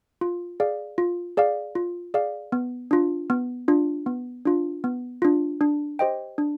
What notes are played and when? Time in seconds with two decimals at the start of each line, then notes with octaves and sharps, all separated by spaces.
0.21 F4
0.60 G#4 D5 F5
0.98 F4
1.37 G#4 D5 F5
1.75 F4
2.14 G#4 D5 F5
2.52 B3
2.91 D4 F4
3.30 B3
3.68 D4 F4
4.06 B3
4.45 D4 F4
4.84 B3
5.22 D4 F4
5.61 D4
5.99 G4 C5 D#5 G5
6.38 D4